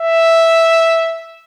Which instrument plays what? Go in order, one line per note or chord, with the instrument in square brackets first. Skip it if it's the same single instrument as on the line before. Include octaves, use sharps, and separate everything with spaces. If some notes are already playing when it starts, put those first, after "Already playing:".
Already playing: [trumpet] E5